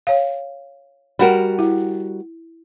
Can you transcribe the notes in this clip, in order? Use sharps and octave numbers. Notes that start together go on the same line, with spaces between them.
C#5 F5
G3 F#4 A#4 B5
E4